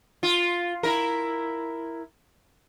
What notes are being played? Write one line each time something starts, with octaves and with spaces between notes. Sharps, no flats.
F4
E4 A#4